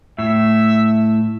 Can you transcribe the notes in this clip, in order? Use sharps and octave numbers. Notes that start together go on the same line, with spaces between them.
A2 E5